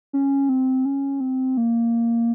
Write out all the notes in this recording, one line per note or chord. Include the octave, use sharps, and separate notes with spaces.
C#4
C4
C#4
C4
A#3